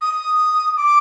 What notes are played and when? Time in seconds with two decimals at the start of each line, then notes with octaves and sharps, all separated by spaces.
0.01 D#6
0.77 D6